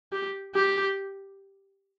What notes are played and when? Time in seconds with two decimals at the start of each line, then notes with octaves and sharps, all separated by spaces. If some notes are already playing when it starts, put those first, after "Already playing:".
0.12 G4
0.55 G4